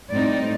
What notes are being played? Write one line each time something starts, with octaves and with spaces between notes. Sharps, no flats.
A2 G3 C4 D#4 D5